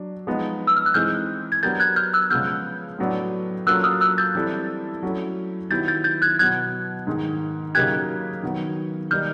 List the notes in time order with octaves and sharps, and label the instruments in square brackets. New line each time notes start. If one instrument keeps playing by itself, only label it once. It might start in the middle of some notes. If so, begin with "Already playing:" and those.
Already playing: [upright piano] F#3 D4
F3 G#3 B3 D#4
[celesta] E6
F6
F#6
[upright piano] E3 G#3 C4 D#4 G#4 [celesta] F6 G6
[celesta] G#6
[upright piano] F#3 B3 D4 G4 A#4 [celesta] G6 A6
[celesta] F#6 G#6
F6 G6
E6 F#6
[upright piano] C#3 F3 G#3 B3 [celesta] F6 G6
[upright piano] A2 F#3 B3 D4
[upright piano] F#3 A#3 C#4 F4 A4 [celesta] E6 F#6
[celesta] D#6 F6
E6 F#6
G6 A6
[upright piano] E3 G3 C4 E4 A4
F#3 A3 C#4 E4
[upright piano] D#3 F#3 B3 E4 G4 [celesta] G6 A6
[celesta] G6 A6
G6 A6
F#6 G#6
[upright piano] B2 F#3 B3 [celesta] F#6 G#6
[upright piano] G#2 D#3 G#3
[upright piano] C#3 F#3 A#3 D#4 G4 [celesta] F#6 G#6
[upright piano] D#3 F#3 B3
[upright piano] D#3 G3 A#3 D#4 [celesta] F6 G6